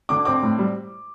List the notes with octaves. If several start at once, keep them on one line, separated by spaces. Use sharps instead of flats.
D3 D6
C4 D6
A2
G3